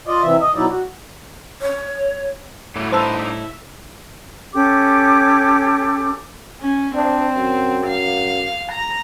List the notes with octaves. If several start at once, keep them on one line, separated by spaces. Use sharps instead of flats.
F4 D5 D#5
C3 E3 E5
D#5
B2 F#3 D#4 E4 D5
F#4
C#5
A2 F#3 G3 A3
G2 D#4 B4 C5 E5 A5 C6 E6
E5
C#4 G4 A4 D6
C#4
C4 D4
F#2
F5
A#5